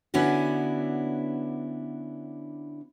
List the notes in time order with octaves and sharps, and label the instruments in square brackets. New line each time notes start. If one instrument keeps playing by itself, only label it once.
[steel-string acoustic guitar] D3 B3 C#4 D4 E4 F#4